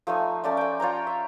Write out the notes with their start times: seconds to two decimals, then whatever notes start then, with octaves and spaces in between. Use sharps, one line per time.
0.07 F3 A3 D#4 G#5
0.44 A3 C#4 D5 G#5
0.57 G5 G#5
0.80 F4 C#5 G5 A#5
1.07 E5